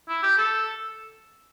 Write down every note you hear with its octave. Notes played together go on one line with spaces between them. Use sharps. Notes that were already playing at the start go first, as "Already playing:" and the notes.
E4
G4
A4